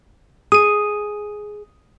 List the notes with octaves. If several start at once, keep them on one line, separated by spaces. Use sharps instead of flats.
G#4 D#6 D#7